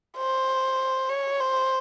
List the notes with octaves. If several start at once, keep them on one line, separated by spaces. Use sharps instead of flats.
C5
C#5
C5